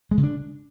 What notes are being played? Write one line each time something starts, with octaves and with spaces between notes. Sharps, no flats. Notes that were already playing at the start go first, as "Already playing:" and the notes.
G#3
C#3
D4